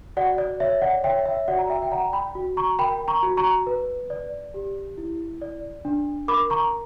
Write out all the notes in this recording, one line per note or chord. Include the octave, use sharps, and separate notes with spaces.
F#4 D5 F#5
D5
C#5 E5
D5 F#5
C#5 E5 G5
E5
F#4 D5 F#5
A#5
E5 G5
G5
D5 F#5 A#5
G5 B5
F#4
A#5 C#6
A#4 G5 B5
A#5 C#6
F#4
A#5 C#6
B4
D5
G4
E4
D5
D4
A#4 B5 D6
A#5 C#6